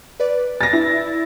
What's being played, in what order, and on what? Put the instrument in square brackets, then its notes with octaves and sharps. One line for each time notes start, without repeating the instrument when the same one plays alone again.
[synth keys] B4 D5
[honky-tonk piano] A6 A#6
E4